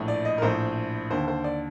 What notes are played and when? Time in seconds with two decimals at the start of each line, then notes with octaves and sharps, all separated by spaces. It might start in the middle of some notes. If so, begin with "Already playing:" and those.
Already playing: A#1 A2
0.08 D5
0.25 D#5
0.38 A#4
0.42 A#1 A2 C5
1.11 D#2 D3 C5
1.28 C5
1.44 D5